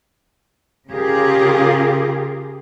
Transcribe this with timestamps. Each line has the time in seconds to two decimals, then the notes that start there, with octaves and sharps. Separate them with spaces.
0.91 C#3 F4 G4 G#4 A#4